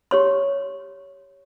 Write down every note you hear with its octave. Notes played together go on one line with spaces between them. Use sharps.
G4 C#5 C6